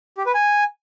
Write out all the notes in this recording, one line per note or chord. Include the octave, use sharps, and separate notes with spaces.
G4
B4
G#5